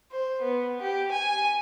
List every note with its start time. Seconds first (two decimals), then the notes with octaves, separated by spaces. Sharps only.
0.11 C5
0.42 B3
0.82 G4
1.11 G#5